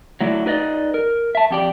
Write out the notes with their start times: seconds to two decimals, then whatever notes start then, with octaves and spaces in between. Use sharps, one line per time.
0.21 F#3 A3 E4 F#4 D5
0.46 D#4 B4 D5 D#5
0.94 A#4
1.35 E5 A5
1.51 F2 G4 D5